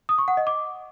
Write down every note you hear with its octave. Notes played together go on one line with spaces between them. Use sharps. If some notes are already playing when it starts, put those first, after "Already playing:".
D#6
C#6
F#5
D#5
D6